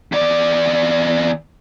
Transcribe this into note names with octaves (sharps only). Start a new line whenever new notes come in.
E2 D5